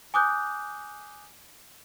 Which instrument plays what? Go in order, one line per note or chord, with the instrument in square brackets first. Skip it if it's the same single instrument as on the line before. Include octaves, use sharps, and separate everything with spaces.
[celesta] G#5 D6 D#6 F#6 G6